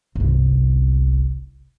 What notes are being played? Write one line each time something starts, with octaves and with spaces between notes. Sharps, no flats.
G1 C2